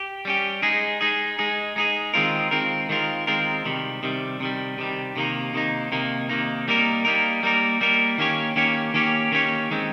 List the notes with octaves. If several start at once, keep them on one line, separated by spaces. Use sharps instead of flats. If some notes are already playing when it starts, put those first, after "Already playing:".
Already playing: G4
G3 C#4 G4
G#3 D#4 G#4
G#3 D#4 G#4
G#3 D#4 G#4
G#3 D#4 G#4
D#3 G#3 C4 F4 A#4
D#3 G#3 C4 F4 A#4
D#3 G#3 C4 F4 A#4
D#3 G#3 C4 F4 A#4
C3 D#3 G3
C3 D#3 G3
C3 D#3 G3
C3 D#3 G3
C3 D#3 A#3 D#4
C3 D#3 A#3 D#4
C3 D#3 A#3 D#4
C3 D#3 A#3 D#4
G3 A#3 D#4 A#4
G3 A#3 D#4 A#4
G3 A#3 D#4 A#4
G3 A#3 D#4 A#4
D#3 A#3 C#4 G4 C#5
D#3 A#3 C#4 G4 C#5
D#3 A#3 C#4 G4 C#5
D#3 A#3 C#4 G4 C#5
D#3 G#3 C4